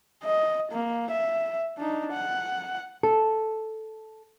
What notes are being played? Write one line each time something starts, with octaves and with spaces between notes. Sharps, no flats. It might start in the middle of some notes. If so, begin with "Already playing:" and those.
D#5
A#3
E5
D4 D#4
F#5
A4